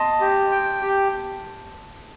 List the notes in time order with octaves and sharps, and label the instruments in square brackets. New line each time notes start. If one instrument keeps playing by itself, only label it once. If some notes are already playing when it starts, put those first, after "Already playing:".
Already playing: [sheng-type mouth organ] D#5 [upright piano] A5 C6
[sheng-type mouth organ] G4
G5
G4